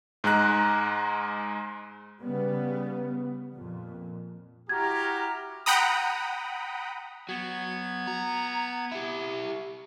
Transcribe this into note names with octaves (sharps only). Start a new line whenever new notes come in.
G#2 G#3 A#5 F#6
C#3 G3 B3
F2 A#2
E4 F#4 G4 A#5 F6 G#6
F#5 G5 A#5 B5 D#6
F#3 B3 G#6
A#5
E4 G4